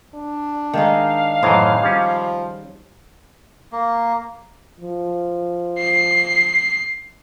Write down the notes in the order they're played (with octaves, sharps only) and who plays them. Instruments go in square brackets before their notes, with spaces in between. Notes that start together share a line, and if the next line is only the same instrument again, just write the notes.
[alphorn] D4
[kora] D#3 G#3 D#4 [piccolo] F5
[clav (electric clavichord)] F#2 A2 E3 [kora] D#4 G#4 C5
[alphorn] F3 [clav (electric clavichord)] G3 C#4
[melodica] A#3
[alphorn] F3
[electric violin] C7